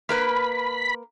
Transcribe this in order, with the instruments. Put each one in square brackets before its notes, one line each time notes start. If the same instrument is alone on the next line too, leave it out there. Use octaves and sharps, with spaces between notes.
[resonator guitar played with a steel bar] A#3 A#4 B4 [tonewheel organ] B5